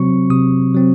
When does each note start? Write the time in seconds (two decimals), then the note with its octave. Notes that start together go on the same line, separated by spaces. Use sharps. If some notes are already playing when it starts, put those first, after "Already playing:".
Already playing: C3 F#3 C4 C#6
0.30 C3 D#6
0.75 F#3 C4